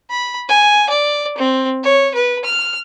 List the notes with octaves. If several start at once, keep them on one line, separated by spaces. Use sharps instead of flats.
B5
G#5
D5
C4
C#5
B4
F6